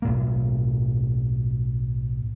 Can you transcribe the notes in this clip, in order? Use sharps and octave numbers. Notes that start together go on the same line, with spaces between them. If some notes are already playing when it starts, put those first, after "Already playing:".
B1 A2 A#3